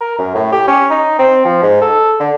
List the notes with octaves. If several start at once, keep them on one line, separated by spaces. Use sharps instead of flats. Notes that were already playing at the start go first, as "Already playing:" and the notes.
A#4
F#2
A2
G4
C#4
D#4
C4
F3
G#2
A4
D3